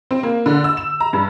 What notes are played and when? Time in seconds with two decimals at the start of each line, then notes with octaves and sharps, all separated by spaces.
0.11 C4
0.23 A#3
0.46 D3
0.64 E6
0.77 E7
1.00 A#5
1.13 G2